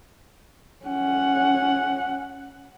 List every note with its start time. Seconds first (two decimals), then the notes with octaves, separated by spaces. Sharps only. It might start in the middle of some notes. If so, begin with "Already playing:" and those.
0.85 C#4 F#5